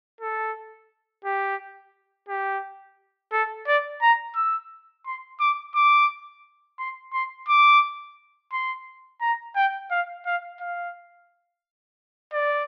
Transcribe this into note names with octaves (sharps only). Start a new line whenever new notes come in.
A4
G4
G4
A4
D5
A#5
E6
C6
D6
D6
C6
C6
D6
C6
A#5
G5
F5
F5
F5
D5